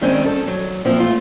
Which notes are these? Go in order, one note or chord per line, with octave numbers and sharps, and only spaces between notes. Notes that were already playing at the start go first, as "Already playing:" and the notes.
G2 D#3 G3 G#3 C4 C#4
A4
F#3
A#2 F3 C4 E4
A3 F4